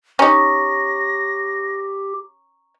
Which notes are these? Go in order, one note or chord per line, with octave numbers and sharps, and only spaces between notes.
C#4 D#4 G4 A#5 C#6 A#6